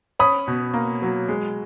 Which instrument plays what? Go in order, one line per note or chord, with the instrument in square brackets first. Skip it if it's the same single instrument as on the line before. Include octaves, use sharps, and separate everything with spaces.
[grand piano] C#4 B5 D#6
B2
A#3
F#3
G#3